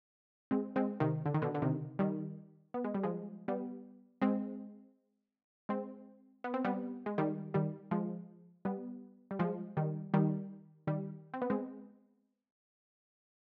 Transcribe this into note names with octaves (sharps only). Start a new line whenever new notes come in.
G#3 C4
G#3 C4
C3 D#3
D3
D#3
B2 D3
D3
C3 D#3
D#3 G3
B3
G#3
G3
F3 G#3
G3 B3
G#3 C4
G#3 C4
B3
C4
G3 B3
G#3
D#3 G3
D#3 G3
F3 G#3
G3 B3
G3
F3 G#3
D#3 G3
D#3 G3
D#3 G3
C4
B3
G#3 C4